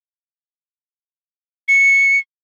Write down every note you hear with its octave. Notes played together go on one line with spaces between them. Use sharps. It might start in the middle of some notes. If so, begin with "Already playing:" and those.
C#7